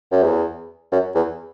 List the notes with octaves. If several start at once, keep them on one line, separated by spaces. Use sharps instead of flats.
F#2
E2
F#2
E2